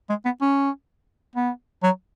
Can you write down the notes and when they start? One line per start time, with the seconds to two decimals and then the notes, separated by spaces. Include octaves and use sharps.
0.09 G#3
0.25 B3
0.41 C#4
1.36 B3
1.83 F#3